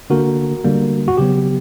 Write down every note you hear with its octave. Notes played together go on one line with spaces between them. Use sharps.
D3 A#3 F#4 A#4
D3 G3 A#3
F#4
C#3 F#3 B3 G4